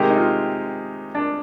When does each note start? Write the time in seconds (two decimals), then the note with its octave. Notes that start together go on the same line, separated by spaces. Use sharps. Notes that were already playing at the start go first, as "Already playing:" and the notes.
Already playing: C3 D#3 G#3 G4
0.10 D#4
0.17 F4
1.15 D4